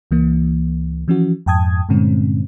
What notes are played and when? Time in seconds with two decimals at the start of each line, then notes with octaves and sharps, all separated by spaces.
0.11 C#2 E3 A#3
1.08 E3 F3 C#4 E4 F#4
1.46 F2 G#2 G5 A5 D#6 G#6
1.89 G2 A#2 D3 G#3 C4 C#4